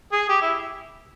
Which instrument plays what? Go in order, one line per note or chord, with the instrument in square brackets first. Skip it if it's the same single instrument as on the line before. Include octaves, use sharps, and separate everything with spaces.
[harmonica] G#4
G4
E4